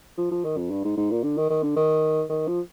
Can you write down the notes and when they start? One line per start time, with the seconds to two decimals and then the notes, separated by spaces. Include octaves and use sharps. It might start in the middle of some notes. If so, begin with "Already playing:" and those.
0.18 F3
0.31 F3
0.45 D#3
0.57 F2
0.71 G2
0.85 G#2
0.97 G#2
1.11 A#2
1.23 D3
1.37 D#3
1.50 D#3
1.63 D3
1.76 D#3
2.29 D#3
2.48 F3